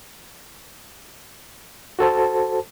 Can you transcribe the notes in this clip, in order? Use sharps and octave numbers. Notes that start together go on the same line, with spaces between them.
F#4 A4 C5 A5